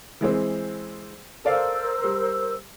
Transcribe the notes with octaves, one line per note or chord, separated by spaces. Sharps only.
E3 G#3 C4
A4 A#4 C5 D5 F5 E6
G3